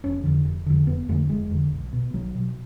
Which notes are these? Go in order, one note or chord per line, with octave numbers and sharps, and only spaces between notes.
F1 C#4
F2 D3
F1
F2 D3
F1 B3
F2 D3 A3
F1 G#3
F2 D3
B1
B2
B1 F#3
B2